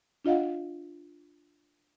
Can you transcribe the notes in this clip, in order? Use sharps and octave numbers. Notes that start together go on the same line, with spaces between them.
D4 F4 D#5 F5 F#5